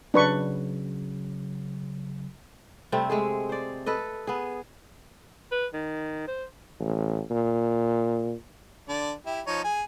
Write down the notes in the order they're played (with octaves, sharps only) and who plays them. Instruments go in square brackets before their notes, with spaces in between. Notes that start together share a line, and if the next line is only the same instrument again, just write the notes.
[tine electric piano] C#3 F#3 [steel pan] D4 B4 C#6
[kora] C3 G3 A3 C4
G#3 A3 G#4
C5 D5
A4 B4 D#5
B3 G#4
[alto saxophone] B4
D#3
C5
[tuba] A1
A#2
[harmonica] D3 D5
E4 G4
F3 D#4 C#5
G#4 G#5